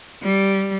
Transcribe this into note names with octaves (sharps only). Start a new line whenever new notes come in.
G3